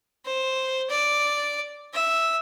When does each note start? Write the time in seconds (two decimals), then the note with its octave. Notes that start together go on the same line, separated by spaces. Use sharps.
0.25 C5
0.90 D5
1.93 E5